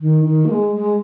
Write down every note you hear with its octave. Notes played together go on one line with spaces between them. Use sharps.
D#3
D#3
A#3
G#3
G#3